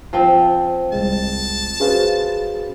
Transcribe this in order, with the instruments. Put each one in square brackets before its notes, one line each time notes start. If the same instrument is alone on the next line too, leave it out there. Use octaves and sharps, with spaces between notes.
[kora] F3 C4
[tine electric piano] C2 G#3 [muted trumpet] A5
[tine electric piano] C#4 F#4 B4 [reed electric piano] G#4 C5 F5